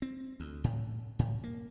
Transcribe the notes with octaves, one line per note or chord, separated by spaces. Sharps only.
C4
D2
A2
A2
A#3